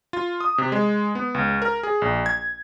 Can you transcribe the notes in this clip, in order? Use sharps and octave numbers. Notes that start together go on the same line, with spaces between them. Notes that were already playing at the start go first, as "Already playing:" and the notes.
F4
D#6
C3
G#3
B3
C#2
A#4
G#4
A#1
G#6